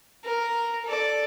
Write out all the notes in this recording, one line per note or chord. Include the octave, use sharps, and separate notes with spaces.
A#4
A4 D5